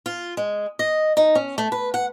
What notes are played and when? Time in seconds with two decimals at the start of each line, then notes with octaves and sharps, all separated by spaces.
0.06 F4
0.37 G#3
0.79 D#5
1.17 D#4
1.35 C#4
1.58 A3
1.72 B4
1.94 F#5